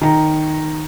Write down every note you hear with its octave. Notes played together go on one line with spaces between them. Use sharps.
D#3 A#5